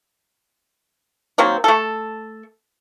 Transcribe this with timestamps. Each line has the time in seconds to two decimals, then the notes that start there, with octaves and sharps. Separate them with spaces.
1.38 D#3 F#3 A#3 C4
1.64 A3 A4